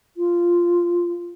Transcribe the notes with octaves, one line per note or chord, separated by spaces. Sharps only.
F4